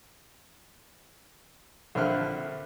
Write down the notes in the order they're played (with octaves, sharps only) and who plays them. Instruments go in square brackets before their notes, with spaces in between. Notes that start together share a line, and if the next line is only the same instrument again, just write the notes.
[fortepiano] A#1 D3 C4 E4 F6 F#6